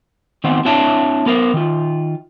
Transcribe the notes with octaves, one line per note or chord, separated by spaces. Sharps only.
D#3 B3 C4 C5 F#5
C4 D4 E4 C#5 E5 A5
B3 A#4 C5
D#3 F4